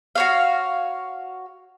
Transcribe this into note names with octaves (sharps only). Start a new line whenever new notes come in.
F#4 C#5 F5